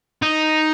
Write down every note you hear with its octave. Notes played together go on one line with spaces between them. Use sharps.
D#4